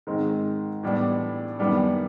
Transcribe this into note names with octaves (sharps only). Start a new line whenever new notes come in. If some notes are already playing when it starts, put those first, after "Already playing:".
G#2 D#3 G#3 C4
A2 E3 G3 B3 D4
F#2 D#3 G3 B3 D4